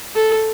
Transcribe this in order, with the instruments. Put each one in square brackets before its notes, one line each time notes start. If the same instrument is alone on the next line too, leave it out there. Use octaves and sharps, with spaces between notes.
[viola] A4